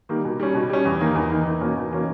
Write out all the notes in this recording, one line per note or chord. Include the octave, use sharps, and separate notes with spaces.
D#3 G3 A#3
B2
G3 C#4
B2
G3 C#4
E2
D#3 A#3 D#4
E2
D#3 A#3 D#4
E2
B2 A#3 C#4
E2
B2 A#3 C#4